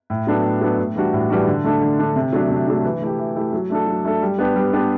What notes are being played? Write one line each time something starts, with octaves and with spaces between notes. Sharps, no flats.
A2
F#3 B3 D4 A4
A2
F#3 B3 D4 A4
A2
E3 G3 D4 F#4
A2
E3 G3 D4 F#4
D3
A3 D4 A4
D3
A3 D4 A4
C3
F#3 A3 D4
C3
F#3 A3 D4
E3
A3 E4 G4
E3
A3 E4 G4
F#3
A3 D4 A4
F#3
A3 D4 A4
G3
B3 D4 G4
G3
B3 D4 G4